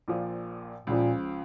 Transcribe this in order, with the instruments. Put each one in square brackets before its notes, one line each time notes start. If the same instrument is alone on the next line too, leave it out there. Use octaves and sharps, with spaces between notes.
[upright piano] A#1 A#2 F3
[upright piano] C#2 C#3 F3 [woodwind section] A#2